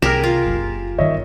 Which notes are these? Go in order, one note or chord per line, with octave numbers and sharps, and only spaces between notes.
C2 G4 G#4 A#4 F6 E7
F4
F#1
G1 D#3 C#5 D#5 E5